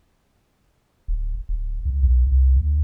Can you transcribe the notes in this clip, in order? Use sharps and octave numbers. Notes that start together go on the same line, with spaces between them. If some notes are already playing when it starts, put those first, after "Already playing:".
D1
D1
C#2
B1
C2
D2